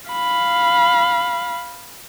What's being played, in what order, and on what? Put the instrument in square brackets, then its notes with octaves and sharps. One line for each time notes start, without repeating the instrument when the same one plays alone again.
[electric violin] F5 B5